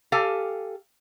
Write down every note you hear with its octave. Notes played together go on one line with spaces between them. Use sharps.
G4 A4 F5 G#5